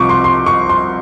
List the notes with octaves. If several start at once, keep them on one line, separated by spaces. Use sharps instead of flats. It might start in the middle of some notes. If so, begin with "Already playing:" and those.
Already playing: C2 C3 F3 C#6 D6
C6
C6
C#6
C6